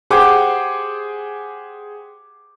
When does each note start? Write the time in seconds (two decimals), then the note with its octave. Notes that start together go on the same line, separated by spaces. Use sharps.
0.10 G4 G#4 C5 F#5 G5 D6